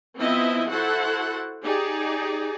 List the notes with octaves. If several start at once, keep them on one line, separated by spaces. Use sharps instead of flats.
F3 B3 C4 E4 D#5 E5
E4 F#4 A4 C5 F#5
D#4 G4 G#4 D5